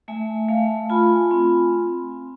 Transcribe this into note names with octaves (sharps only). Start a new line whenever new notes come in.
A3 E5 G#5
A3 F5 A5
F4 G#5 B5
C4